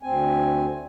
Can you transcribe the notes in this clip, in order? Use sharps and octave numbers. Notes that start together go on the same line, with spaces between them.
D2 C4 G#5